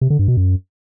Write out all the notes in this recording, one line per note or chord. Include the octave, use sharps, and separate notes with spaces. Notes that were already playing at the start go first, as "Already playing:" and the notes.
C3
D3
G2
B2
F#2